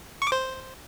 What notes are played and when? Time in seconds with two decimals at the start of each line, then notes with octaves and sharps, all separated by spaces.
0.22 C#6
0.27 D6
0.32 C5